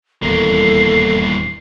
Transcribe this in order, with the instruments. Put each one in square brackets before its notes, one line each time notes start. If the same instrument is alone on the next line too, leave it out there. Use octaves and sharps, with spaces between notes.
[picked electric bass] D#1 E2 [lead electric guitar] G2 A#3 [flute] A4 [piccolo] C7